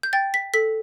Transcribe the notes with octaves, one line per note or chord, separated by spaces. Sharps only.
G6
G5 A6
B6
A4 B6